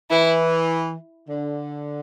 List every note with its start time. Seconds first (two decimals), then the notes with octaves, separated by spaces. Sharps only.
0.10 E3 E4
1.28 D3